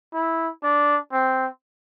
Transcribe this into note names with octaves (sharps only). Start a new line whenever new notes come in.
E4
D4
C4